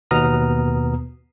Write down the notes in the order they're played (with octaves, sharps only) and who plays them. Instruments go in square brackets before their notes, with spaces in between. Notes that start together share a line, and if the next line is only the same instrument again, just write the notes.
[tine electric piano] D#2 B2 B3 A#5 D#6 F6